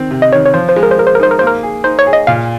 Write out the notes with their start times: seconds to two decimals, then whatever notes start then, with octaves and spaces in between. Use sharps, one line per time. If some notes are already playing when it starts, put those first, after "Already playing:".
Already playing: D#3 C4
0.11 C3
0.22 D#5
0.33 D#3 C#5
0.46 C#5
0.54 F3 C5
0.69 C5
0.76 G#3
0.83 A#4
0.91 C5
0.98 G#3 A#4
1.07 C5
1.15 A#4
1.20 D#4 C5
1.31 A#4
1.39 A#3 C5
1.47 A#4
1.63 G#4
1.84 D#4 C5
1.99 C#5
2.06 G#4
2.13 D#5
2.27 A#2 F5